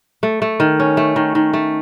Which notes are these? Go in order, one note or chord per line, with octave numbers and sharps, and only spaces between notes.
A3
A3
D#3
C#4
A3
D#3
D#3
A3